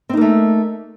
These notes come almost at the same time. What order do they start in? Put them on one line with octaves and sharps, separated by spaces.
C4 D#4 A#3 A3